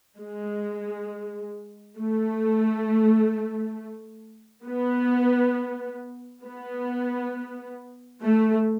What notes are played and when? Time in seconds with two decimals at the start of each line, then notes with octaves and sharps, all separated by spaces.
0.19 G#3
1.99 A3
4.66 B3
6.44 B3
8.23 A3